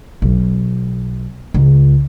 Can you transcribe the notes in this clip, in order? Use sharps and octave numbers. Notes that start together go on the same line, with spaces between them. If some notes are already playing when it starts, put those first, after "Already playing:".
B1
C#2